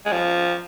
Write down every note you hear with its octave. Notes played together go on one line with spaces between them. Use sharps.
G#3
F3